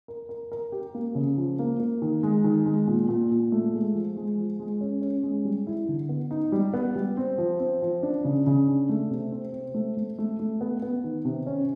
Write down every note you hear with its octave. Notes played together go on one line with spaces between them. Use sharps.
A#4
A#4
A#4
G4
A#3
C#3
F3
A#3
A#3
D#3
G#3
D#3
G#3
A#2
A#2
A#2
A3
G#3
F3
G#3
F3
G#3
C#4
C#4
G#3
G3
E4
D3
B3
D#4
G3
B3
G3
C4
F3
C4
F3
D4
C#3
C#3
D4
A3
C3
C4
C4
A3
A3
A3
A3
B3
B3
D#3
C3
C#4